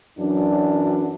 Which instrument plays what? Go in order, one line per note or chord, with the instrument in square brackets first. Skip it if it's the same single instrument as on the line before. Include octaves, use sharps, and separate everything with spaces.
[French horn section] F#2 E3 F#3 D4